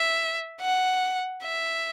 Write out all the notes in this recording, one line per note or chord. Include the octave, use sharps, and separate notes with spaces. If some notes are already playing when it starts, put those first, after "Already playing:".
Already playing: E5
F#5
E5